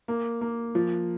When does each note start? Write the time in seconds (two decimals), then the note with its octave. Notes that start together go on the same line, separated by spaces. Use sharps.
0.08 A#3
0.41 A#3
0.75 F3